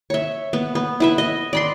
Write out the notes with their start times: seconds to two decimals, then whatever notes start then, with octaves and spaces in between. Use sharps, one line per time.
0.10 C#5 E5
0.53 B3
0.75 B3
1.00 E4 B4 E5
1.18 D#5
1.53 D5 B5 C6